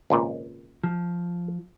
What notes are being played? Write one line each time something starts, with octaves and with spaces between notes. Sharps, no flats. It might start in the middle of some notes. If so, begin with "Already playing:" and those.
G#1 C#2 A#2
F3